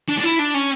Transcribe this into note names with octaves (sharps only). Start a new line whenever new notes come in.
D4
D4
E4
D4
C#4